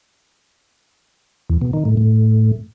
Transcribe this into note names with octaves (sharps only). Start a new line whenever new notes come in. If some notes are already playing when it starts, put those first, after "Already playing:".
E2
B2
D#3
A2
A2